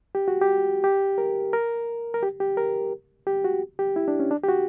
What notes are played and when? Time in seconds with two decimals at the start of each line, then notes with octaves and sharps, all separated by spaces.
0.15 G4
0.28 F#4
0.42 G4
0.84 G4
1.18 A#4
1.53 A#4
2.14 A#4
2.23 G4
2.40 G4
2.57 A#4
3.27 G4
3.44 F#4
3.79 G4
3.96 E4
4.08 D4
4.19 C#4
4.31 D4
4.44 G4
4.49 F#4